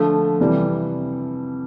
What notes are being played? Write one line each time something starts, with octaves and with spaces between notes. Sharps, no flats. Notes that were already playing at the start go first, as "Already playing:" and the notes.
Already playing: D3 F3 A3
C3 E3 G3